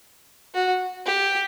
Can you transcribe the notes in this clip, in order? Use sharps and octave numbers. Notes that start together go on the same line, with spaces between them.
F#4
G4